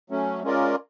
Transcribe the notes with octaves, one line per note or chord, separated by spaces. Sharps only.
F#3 A3 C#4
G#3 C#4 F4 A#4 D5